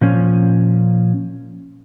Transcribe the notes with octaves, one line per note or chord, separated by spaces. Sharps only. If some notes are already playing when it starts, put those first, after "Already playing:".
A#2 F3 C#4